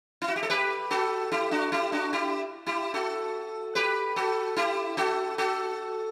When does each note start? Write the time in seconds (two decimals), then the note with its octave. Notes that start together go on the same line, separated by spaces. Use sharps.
0.22 E4
0.28 F#4
0.36 G4
0.43 A4
0.50 G4 B4
0.91 F#4 A4
1.32 E4 G4
1.51 D4 F#4
1.72 E4 G4
1.92 D4 F#4
2.13 E4 G4
2.66 E4 G4
2.94 F#4 A4
3.75 G4 B4
4.16 F#4 A4
4.56 E4 G4
4.97 F#4 A4
5.38 F#4 A4